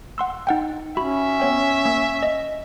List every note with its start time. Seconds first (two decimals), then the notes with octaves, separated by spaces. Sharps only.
0.18 F#5 C6 E6
0.47 D#4 F#5 G5
0.97 C#4 F#4 E5 B5
1.40 B3 C#5 G5
1.85 A#3
2.23 D#5